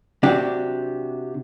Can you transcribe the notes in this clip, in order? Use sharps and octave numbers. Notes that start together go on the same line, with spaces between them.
C3 D4 F#4 G4